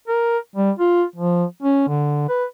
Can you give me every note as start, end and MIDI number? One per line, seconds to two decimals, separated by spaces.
0.08 0.38 70
0.56 0.71 55
0.79 1.03 65
1.16 1.45 53
1.63 1.85 61
1.88 2.25 50
2.29 2.45 71